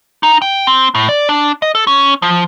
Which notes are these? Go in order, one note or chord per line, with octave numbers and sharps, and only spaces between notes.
D#4
G5
C4
A2
D5
D4
D#5
A4
C#4
F3